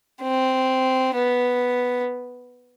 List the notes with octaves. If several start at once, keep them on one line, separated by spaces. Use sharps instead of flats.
C4
B3